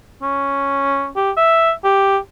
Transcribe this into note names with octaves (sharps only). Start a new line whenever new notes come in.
C#4
G4
E5
G4